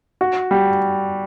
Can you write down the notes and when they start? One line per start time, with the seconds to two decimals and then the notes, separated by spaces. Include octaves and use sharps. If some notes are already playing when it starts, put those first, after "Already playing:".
0.21 F#4
0.51 G3